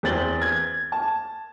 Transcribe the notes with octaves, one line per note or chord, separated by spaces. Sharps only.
E2 C4 C5 A6 F#7 G7
G#6
A5